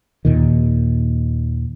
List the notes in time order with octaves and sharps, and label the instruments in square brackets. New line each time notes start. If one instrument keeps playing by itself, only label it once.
[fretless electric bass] D#2 A#2 D#3